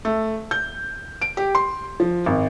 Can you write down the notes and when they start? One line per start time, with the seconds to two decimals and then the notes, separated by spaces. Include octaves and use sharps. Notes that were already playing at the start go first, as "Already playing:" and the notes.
0.05 A3
0.51 G6
1.22 D7
1.37 G4
1.55 C6
2.00 F3
2.26 G#1